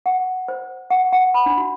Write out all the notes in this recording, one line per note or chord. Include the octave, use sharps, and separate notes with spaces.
F#5
C5
F#5
F#5
B5
D4
F#4